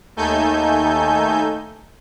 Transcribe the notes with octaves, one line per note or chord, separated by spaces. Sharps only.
D#2 A3 D#4 A4 G#5 G6